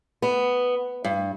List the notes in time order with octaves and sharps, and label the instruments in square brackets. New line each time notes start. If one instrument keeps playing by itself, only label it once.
[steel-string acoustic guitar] B3
G2